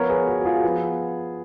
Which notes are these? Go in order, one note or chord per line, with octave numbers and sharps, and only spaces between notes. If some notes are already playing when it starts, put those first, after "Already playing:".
Already playing: F3 B3 F4 A#4 C#5
G#4 B4
F#4
F#4
F4 G#4
F3 B3 F4